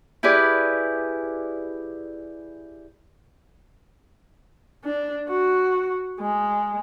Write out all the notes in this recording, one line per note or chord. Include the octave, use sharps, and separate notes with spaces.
E4 G4 G#4 B4 D5
D4
F#4
G#3